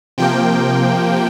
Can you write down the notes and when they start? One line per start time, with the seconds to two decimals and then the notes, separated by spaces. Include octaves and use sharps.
0.18 C3 F3 A#3 G5